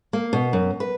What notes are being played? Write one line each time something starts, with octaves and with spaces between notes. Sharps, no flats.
A#3
B2
F#2
B4